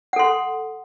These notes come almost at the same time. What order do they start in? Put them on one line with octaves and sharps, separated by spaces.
F#5 A4 C6